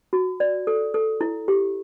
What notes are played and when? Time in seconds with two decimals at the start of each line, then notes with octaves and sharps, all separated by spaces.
0.13 F#4
0.40 D5
0.67 A4
0.94 A4
1.21 E4
1.48 G4